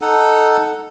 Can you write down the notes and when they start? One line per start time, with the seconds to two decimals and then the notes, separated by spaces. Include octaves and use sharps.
0.01 D#4 A4 F#5